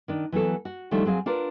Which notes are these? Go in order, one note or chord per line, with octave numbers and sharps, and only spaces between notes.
D#3 D4
E3 F#3 B3 A4
F#4
D#3 F3 G3 A3 D4 F4
F#3 C4 G#4 F5
D4 F4 A#4 B4 D5